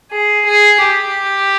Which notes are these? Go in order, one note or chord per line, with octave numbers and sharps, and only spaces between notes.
G#4
G#4
G4